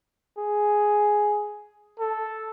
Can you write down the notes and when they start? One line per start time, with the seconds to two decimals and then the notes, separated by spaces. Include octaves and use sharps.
0.38 G#4
1.99 A4